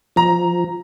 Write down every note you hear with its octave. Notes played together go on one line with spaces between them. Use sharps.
F3 A#5